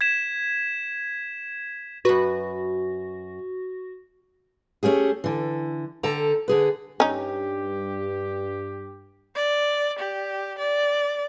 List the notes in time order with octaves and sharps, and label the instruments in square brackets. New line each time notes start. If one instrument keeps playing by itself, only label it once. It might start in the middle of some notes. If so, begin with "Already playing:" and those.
[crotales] G#6 B6 E7
[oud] F#2 B4 [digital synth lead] F#4
[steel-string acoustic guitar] A3 C#4 G4 G#4
D3 E3
D3 A4 G5 A#5
D3 G#4 B4
[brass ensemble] G2 G4 [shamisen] C#4 D#4
[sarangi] D5
G4
D5